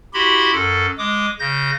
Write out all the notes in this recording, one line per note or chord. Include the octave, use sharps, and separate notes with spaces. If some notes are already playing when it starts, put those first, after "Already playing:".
E4 F#4 G4 B5 C6
F#2 A4
G#3 D6 D#6
C#3 G6 A#6